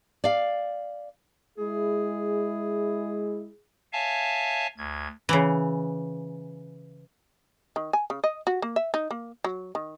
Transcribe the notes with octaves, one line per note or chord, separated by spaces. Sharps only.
D5 F5
G#3 E4 G#4
C#5 E5 F5 G#5 A5
D2 G#6
C#3 E3
D#3
G#5
C#3
D#5
F#4
A#3
E5
D#4
A#3
F#3
D#3